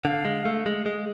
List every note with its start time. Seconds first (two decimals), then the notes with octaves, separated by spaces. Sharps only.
0.04 D3 F5 F#5
0.25 G#3
0.45 A3
0.66 G#3
0.86 G#3